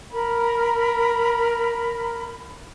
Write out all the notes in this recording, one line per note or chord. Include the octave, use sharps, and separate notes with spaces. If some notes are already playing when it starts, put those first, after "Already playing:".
A#4 B5